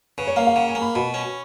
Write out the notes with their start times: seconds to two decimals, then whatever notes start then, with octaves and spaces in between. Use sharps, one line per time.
0.18 C#3 B4
0.27 C#5
0.36 A#3 F5
0.47 F5
0.56 C#3 F#5
0.69 G#5
0.75 A#3
0.82 B5
0.95 B2 B5
1.14 C#4